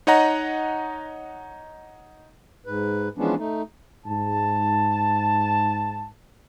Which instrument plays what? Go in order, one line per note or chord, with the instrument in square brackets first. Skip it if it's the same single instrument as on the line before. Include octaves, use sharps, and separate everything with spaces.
[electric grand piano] D#4 C#5 D#5 F#5 A#5
[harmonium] G#2 B4
E3 F3 G#3 B3 C#4 D4
A3 D#4
[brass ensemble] G#2 A5